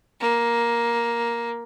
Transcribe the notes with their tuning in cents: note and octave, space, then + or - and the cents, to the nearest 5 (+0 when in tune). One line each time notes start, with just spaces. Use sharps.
A#3 +10